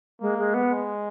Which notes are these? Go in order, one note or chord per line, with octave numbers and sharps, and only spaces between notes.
G#3 A#3
G#3
B3
G#3